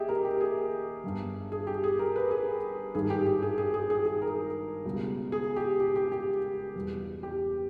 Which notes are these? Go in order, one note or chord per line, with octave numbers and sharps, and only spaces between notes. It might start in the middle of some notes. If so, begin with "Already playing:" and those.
Already playing: D#2 G4 G#4 D#5 E5
A#4
G4
G#4
G1 G2 G3
G#4
G4
G#4
A#4
B4
G#4
G#1 G2 D#3 G3 G#4
G4
G4
G#4
G#4
G#4
G#4
G#4
A#4
C#2 B2 G3
G#4
G4
G4
G4
G4
E2 B2 G3
G4